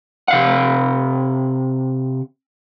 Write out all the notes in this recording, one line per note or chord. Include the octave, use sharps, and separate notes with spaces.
C3 F5 F#5